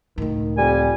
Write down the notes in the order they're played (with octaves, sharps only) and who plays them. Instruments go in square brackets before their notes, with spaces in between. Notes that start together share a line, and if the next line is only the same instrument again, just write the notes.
[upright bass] C#2 A2 [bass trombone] D#3
[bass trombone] F2 [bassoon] G3 [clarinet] G#5